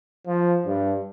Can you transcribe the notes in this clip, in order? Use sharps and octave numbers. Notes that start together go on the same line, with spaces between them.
F3
G2